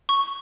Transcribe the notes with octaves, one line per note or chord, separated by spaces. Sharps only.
C#6